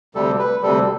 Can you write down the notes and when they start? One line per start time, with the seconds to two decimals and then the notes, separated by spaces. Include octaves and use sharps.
0.15 D2 C3 G3 A4
0.39 B4
0.62 D2 C3 G3 A4